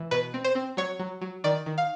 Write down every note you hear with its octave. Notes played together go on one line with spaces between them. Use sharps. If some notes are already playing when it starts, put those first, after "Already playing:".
Already playing: E3
B2 B4
C4
C5
C4
F#3 C#5
F#3
F#3
D#3 D5
D#3
F5